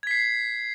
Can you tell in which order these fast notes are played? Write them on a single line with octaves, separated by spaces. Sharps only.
G#6 B6 C7